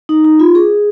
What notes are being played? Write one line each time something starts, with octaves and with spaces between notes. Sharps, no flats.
D#4
D#4
F4
G#4